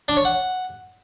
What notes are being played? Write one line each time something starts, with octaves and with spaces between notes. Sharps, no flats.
D4
C#5
F#5